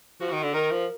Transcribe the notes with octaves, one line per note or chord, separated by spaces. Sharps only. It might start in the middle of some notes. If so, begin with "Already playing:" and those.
F3 F#4
D#3
D3
D#3 A#4
F3